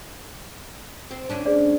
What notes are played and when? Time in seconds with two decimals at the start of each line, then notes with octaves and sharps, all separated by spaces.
1.11 C4
1.29 D2 C#4 D4
1.46 G#4 C5 D5